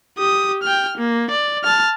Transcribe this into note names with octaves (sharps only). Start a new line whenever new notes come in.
G4 D#6
G5 F6
A#3
D5
A5 F6